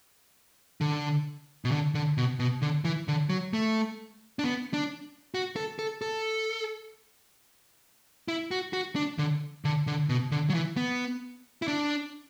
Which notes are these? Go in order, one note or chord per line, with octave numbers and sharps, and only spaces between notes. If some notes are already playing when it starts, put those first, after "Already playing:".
D3
B2
D3
D3
B2
B2
D3
E3
D3
F#3
A3
D4
B3
D4
F#4
A4
A4
A4
E4
F#4
F#4
D4
D3
D3
D3
B2
D3
F#3
E3
B3
E4
D4